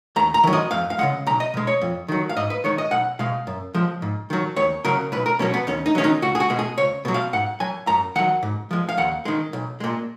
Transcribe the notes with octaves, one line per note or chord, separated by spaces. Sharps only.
D#2 A#5
A#5
D#3 F#3
D#5
F2 F5
F5
C#3 F3 G#3 F#5
B1 A#5
D#5
B2 G#3
C#5
F2
D#3 F#3
F5
G#2 D#5
B4
D#3 G#3 C#5
D#5
B1 F#5
B2 G#3 F5
F#2
F3 G#3
G#2
D#3 F#3
D#2 C#5
C#3 F#3 A#4
B1 B4
A#4
B2 F#3 C#4
B3
D#2 C#4
D#4
D#3 F#3 C#4
D#4
C#2 F#4
G#4
F#4
B2 G#3
G#4
C#2 C#5
B2 F#3
F5
G#2 F#5
F#3 G#5
F#2 A#5
D#3 F#3 F#5
G#2
F3 G#3
F5
D#2 F#5
D#3 G#3
B1
A#2 G#3